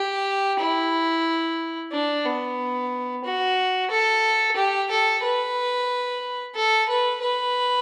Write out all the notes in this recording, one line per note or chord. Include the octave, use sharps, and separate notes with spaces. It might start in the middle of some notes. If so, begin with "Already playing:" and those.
Already playing: G4
E4
D4
B3
F#4
A4
G4
A4
B4
A4
B4
B4